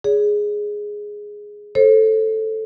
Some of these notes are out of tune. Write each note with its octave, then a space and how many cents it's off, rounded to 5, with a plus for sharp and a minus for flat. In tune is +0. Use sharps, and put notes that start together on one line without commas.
G#4 +0 C#5 +45
A4 +0 C5 +40